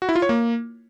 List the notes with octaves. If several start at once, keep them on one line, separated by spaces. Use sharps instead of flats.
F#4
E4
F4
C#5
A#3